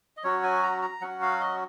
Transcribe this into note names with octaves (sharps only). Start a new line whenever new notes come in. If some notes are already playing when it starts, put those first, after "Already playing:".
D#5
F#3 C#4 F#4 C#5
G#5
A#5
A#5
F#3 C#4 F#4 F#5
F5
D#5